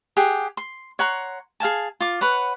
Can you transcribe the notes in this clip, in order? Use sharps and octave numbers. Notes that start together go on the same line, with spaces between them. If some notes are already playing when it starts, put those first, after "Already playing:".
G4 G#4 F#5 G5
C6
C#5 F#5 A#5 C6
G#4 F5 G#5 A5
F4 D6
B4 C#5 F#5